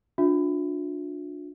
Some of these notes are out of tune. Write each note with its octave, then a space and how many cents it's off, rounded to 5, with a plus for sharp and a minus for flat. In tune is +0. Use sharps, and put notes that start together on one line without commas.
D4 +0 F4 +45 E5 +0